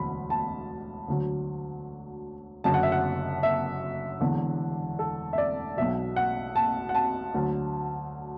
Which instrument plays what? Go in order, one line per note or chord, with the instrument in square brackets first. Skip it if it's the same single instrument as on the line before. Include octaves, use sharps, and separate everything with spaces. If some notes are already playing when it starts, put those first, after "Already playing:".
Already playing: [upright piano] E1 D2 D3 F#3 B5
A5
D2 D3 F#3
F#1 F#2 D3 F#3 A5
F#5
E5
F#5
E5
E1 E2 D3
A4
E5
D5
B1 B2 F#3 E5
F#5
A5
F#5
A5
D2 D3 F#3